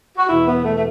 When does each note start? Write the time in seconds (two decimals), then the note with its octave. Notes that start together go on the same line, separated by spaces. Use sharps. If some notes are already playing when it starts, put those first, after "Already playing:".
0.18 F#4
0.29 E2 B2 E4
0.47 B3
0.65 A3
0.75 A3